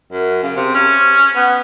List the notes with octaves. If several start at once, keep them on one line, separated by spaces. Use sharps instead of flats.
F#2
C#3
C3
C#4
B3